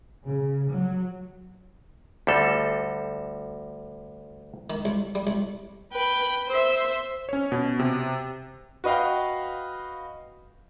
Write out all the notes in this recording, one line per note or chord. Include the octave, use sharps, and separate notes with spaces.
C#3
F#3
D2 G3 A4
D#3
C2
G3
C2
B4 G5
C5 E5
C#4 C#5
B2
C3
F#4 B4 D#5 F5 G5